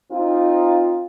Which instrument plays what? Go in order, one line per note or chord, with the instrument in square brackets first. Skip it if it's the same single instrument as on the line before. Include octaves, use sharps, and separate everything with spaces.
[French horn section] C4 D#4 F4